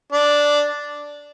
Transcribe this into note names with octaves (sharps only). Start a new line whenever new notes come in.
D4